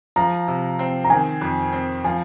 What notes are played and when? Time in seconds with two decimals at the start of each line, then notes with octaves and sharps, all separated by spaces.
0.16 F3 A#5
0.48 C3
0.79 C4
1.04 A#5
1.10 D#3 G#5
1.41 F2
1.73 C4
2.04 F3 G#5